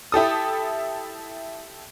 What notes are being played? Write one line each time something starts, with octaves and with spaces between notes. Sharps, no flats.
E4 G4 A4 D#6